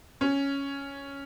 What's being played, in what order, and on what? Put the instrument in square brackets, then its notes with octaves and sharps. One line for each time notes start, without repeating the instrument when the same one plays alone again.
[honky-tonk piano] C#4